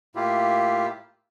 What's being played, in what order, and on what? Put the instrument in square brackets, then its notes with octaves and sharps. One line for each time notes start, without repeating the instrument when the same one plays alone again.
[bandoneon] A2 A#3 E4 F4 G4